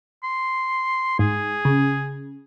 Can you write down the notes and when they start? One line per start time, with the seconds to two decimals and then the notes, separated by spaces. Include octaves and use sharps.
0.24 C6
1.19 G#2 G#4
1.65 C#3